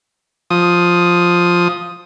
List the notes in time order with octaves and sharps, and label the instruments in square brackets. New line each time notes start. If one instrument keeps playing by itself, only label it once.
[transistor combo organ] F3 D#6